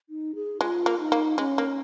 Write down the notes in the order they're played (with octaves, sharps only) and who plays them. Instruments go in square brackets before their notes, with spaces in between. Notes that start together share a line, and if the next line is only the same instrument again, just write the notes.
[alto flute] D#4
G#4
[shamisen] G#3 [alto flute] F4
[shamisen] A#3
[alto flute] D#4
[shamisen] A#3
[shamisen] G#3 [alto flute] C#4
[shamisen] A#3